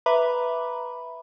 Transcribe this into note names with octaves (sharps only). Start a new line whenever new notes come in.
B4 E5 A#5 B5 D6